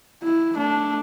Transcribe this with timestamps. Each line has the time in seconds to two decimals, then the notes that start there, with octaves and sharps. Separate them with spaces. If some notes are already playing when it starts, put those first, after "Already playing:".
0.23 E4
0.54 A3 D4